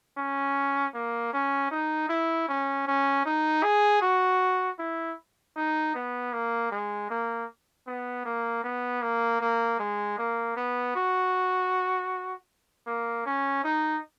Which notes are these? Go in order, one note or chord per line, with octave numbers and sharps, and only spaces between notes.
C#4
A#3
C#4
D#4
E4
C#4
C#4
D#4
G#4
F#4
E4
D#4
B3
A#3
G#3
A#3
B3
A#3
B3
A#3
A#3
G#3
A#3
B3
F#4
A#3
C#4
D#4